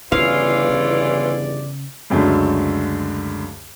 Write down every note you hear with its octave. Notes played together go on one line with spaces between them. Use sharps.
G1 E2 C#3 E3 C#4 F4 D5 F5
C#3
C#2 F#2 D3 A3